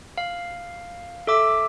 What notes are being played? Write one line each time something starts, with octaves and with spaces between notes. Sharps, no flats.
F5
A4 E5 D6 E6